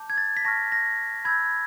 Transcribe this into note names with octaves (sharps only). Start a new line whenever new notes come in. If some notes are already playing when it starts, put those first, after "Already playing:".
Already playing: A5 D6 G6
G#6
A6
B6
A5 C#6 F6 A#6
A#6
B5 E6 G6 G#6